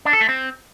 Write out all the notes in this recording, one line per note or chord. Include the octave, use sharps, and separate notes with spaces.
D4
A4
A3
C4